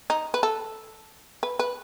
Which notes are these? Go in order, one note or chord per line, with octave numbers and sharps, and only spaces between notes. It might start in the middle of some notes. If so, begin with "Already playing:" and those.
D#4
B4
A4
B4
B4